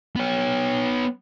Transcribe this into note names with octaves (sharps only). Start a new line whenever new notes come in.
B3 C#5